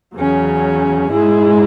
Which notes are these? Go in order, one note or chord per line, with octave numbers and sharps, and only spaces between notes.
E2 C#3 F#3 C#4
G#2 G#3 E4 G#4